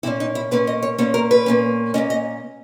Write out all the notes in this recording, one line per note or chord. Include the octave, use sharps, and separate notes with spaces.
A#2 A#3 C#4 E4
D#4
E4
A#2 A#3 C#4 B4
D#5
C#5
A#2 A#3 C#4 C#5
A#4
B4
A#2 A#3 C#4
A#2 A#3 C#4 D#5
D#5